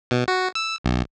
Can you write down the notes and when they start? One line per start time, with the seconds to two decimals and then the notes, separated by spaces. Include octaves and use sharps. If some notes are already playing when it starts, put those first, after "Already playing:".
0.11 B2
0.28 F#4
0.55 E6
0.84 B1